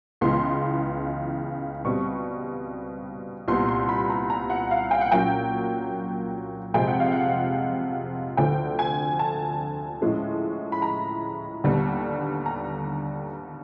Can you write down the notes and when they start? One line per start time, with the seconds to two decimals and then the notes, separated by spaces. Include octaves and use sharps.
0.21 C#2 C#3 E3 G#3 B3 C6
1.85 B2 G3 C4 C#6
3.48 C2 A#2 G3 B3 C6
3.69 C6
3.89 B5
4.10 A#5
4.30 A#5
4.50 F#5
4.71 F5
4.91 G5
5.01 F#5
5.11 A#2 F#3 A#3 C#4 G5
6.74 F2 C3 F3 G#3 C4 G5
6.87 F#5
7.00 F5
7.12 F#5
8.37 D2 D3 F3 A3 G5
8.79 G#5
9.19 A5
10.01 A2 F3 G#3 C#4
10.72 B5
10.82 A#5
11.64 D#2 D3 G3 B3
12.46 A#5